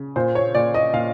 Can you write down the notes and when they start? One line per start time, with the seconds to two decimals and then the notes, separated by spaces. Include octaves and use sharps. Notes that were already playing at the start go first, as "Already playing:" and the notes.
Already playing: C#3
0.16 A#2 C5
0.35 C#5
0.55 A#2 D5
0.74 D#5
0.93 A#2 F5